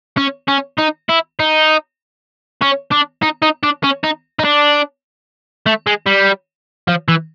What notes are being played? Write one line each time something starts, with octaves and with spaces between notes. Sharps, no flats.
C#4
C#4
D#4
E4
D#4
C#4
D4
D#4
D#4
D4
C#4
D#4
D#4
D4
A3
G#3
G3
F3
E3